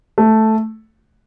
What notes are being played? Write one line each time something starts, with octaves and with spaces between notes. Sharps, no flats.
A3